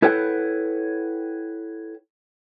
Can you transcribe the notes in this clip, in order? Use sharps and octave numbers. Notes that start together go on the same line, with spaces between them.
E4 A4 B4 C#5 F#5 G5